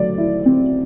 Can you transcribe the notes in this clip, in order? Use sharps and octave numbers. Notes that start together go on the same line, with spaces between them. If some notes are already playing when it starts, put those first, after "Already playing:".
Already playing: F#3 A3 D5
E4
C4